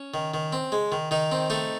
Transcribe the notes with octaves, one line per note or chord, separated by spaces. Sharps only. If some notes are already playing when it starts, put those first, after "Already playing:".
Already playing: C#4
D#3
D#3
C4
G#3
D#3
D#3 D#4
C4
A3 D#4